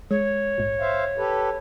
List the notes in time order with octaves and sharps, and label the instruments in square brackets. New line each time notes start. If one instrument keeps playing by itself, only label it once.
[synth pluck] G#3 [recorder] C#5
[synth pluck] A#1 G#2
[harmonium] C5 E5 F5
G4 A4 B4